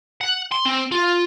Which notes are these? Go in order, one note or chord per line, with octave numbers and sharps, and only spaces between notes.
F#5
C6
C4
F4